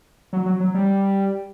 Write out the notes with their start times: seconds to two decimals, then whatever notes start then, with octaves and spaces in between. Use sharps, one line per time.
0.33 F#3
0.46 F#3
0.60 F#3
0.74 G3